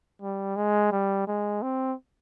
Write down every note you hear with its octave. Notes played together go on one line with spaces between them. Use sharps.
G3
G#3
G3
G#3
C4